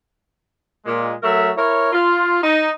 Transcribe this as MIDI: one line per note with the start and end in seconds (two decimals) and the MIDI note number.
0.85 1.13 46
0.85 1.13 56
1.22 1.49 54
1.22 1.49 57
1.22 1.49 70
1.22 1.49 76
1.56 1.90 64
1.56 1.90 70
1.56 1.90 73
1.92 2.39 65
2.42 2.69 63